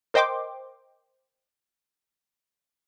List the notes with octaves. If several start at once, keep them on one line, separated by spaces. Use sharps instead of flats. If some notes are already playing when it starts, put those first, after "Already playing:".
A#4 C5 D#5 G5 C6 D6